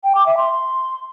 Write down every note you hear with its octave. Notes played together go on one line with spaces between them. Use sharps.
G5
D6
E5
C6